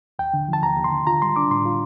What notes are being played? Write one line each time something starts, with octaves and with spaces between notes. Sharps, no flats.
D#2 G5
D3
F3 A5
D#2 A#5
D#2
C6
D3
F4 A#5
G3 C6
D4 D6
A2 C6
F4